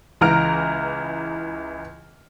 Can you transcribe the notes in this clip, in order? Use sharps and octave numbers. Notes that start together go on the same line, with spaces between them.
C#2 E3 A#5 F6 D7